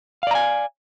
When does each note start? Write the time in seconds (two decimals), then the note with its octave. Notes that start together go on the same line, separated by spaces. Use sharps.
0.23 F5
0.27 D5
0.31 A#5
0.35 G#5